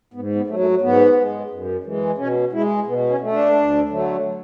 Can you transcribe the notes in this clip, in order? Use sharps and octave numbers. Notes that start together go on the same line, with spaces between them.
G#2 B3
B3
F#3 A3
A3
G#2 B3
G#3
F#2
E3 G#3
B2 C#4
G#3 E4
B2 B3
C#4
A3
D4
D2
D3 F#3 A3